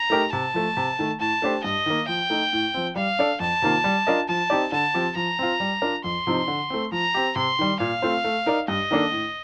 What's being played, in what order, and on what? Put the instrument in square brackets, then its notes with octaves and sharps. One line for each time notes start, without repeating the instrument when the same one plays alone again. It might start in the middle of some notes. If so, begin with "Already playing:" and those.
Already playing: [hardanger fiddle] A#5
[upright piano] A3 D#4 G4 A#4
[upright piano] C3 [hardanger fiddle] A5
[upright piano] F3 A3
C3
D#3 A3
[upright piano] A2 [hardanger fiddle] A5
[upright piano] A3 D4 G4 C5
[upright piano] G2 [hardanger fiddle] D#5
[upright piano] D#3 A#3
[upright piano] F3 [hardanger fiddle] G5
[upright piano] A3 D#4
A2
F3 C4
[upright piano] G3 [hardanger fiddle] F5
[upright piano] D4 A4 D5
[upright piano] F2 [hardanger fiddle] A5
[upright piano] C3 D#3 A#3 F4
G3
D4 F4 A#4 D#5
[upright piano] F3 [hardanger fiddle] A5
[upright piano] C4 D#4 G4 D5
[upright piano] D3 [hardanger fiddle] A5
[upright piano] F3 C4 G4
[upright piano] F3 [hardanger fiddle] A#5
[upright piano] C4 F4
G3
D4 F4 A#4 D5
[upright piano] F2 [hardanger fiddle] C6
[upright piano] C3 F3 C4 D#4
D3
A3 C4
[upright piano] F3 [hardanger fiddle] A#5
[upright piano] C4 G4
[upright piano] C3 [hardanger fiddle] C6
[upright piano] D#3 G3
[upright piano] A#2 [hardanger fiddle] F5
[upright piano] A3 C4 F4 C5
A3
D#4 A#4 D5
[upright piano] G2 [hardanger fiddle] D#5
[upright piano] D#3 A#3 D4 A4
A2